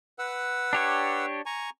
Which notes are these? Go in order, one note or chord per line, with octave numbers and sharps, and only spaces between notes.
B4 F#5 E6
D4 G4 C#5
G#5 A#5 C#6